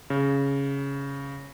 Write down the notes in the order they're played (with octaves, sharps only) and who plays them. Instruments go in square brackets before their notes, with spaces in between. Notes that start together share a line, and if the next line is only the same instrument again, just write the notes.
[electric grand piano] C#3